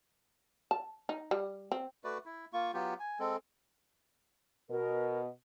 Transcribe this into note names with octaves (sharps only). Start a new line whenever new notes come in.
A5
D#4
G3
C4
A3 F#4 B4 D5
E4
A#3 F4 C#6
F#3 B3 F4 G4
G#5
G#3 C4 A4
B2 A#4